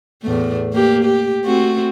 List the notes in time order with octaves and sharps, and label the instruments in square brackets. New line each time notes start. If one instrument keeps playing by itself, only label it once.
[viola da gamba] E2 A2 A3
A#3 G4
G4
A3 C4 F#4